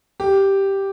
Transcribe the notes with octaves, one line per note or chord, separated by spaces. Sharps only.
G4